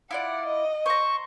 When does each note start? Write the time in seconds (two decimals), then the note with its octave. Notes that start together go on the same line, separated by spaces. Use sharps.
0.11 E4 F4 D5 F#5
0.46 D#5
0.86 C5 A#5 C#6